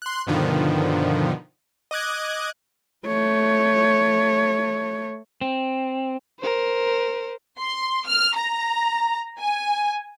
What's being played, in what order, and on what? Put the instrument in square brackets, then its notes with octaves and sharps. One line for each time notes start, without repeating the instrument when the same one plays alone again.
[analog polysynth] C6 F#6
G2 B2 D3 D#3 F3
D#5 D6 F#6 G#6
[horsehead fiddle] A3 C#5
[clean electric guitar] C4
[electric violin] A#4 C5
[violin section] C6
F6
A#5
G#5